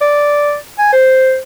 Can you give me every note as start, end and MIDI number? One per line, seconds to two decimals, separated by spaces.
0.01 0.57 74
0.79 0.93 80
0.93 1.39 72